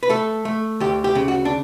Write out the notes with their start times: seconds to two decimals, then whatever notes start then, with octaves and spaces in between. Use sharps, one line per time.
0.03 B4
0.09 A3 A4
0.45 A3
0.80 D2 G4
1.04 G4
1.15 C#3
1.28 F#4
1.45 D4